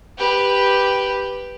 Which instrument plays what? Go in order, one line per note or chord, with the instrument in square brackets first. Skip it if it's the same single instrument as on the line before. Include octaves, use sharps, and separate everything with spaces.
[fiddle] G4 B4